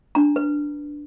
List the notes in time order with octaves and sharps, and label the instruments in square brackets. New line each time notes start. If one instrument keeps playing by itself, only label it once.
[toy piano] D4 A#5
B4